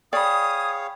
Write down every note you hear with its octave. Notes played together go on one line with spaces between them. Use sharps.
G#4 C#5 D5 F5 G5 B5 D#6